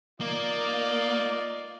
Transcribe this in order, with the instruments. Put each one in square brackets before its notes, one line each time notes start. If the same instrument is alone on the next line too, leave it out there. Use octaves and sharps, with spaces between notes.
[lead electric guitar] A#3 [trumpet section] D#4 F4 D5